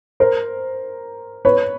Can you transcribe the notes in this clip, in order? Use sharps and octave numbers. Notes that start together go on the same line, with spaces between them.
A#4 C5
B4 C#5